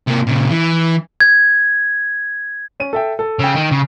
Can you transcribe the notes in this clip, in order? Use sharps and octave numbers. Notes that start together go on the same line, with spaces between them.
C3 A#3
A#2 C#3
E3
G#6
C#4 D#7
A4 E5 G5
A4
C#3 G5 E6
D#3
C#3